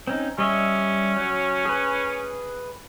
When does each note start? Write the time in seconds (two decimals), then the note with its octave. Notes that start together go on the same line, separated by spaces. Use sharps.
0.07 C4 C#4 D#4
0.38 G3 C#4 D#5 E5
1.17 F#3
1.65 G#4 B4